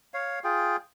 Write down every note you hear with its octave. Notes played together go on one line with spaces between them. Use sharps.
C#5 F5
F4 G#4 G5